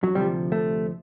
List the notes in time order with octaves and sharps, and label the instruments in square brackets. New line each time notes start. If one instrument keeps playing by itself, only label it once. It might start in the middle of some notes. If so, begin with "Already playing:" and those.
[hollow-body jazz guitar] F#3
D2 C3 F3 G3
A3